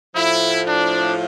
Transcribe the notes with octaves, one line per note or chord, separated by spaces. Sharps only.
A2 F3 E4
D4